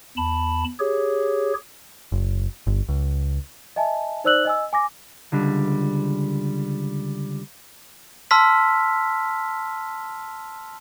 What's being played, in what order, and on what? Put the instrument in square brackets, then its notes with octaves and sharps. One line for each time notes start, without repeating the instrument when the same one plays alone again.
[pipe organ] E2 A5 B5
G4 G#4 C#5
[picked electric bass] F#1
G1
C#2
[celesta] D#5 E5 G#5 A5
D#4 C5 D5 E6 F#6 F#7
D#5 G#5 E6
G#5 D6 A#6
[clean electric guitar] C#2 D3 G3
[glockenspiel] A5 C6 E6 F6 B6